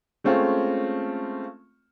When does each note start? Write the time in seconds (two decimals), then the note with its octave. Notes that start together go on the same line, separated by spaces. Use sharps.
0.24 G#3 A3 C4 C#4 F4